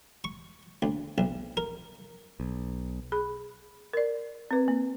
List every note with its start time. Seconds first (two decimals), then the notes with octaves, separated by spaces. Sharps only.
0.24 C#6
0.82 D2
1.18 B1
1.57 A#4
2.40 B1
3.12 G#4 B5
3.93 A#4 D5
4.51 C4 B4
4.68 A#3